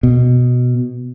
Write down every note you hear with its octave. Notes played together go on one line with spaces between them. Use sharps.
B2